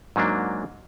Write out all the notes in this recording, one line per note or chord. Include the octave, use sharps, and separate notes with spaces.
G#2 F#3 A#3 D4